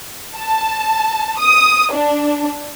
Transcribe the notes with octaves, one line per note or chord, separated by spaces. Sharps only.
A5
D#6
D4